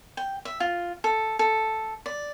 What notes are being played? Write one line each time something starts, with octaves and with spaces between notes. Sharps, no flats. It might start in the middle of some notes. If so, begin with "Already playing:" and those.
G5
E5
F4
A4
A4
D5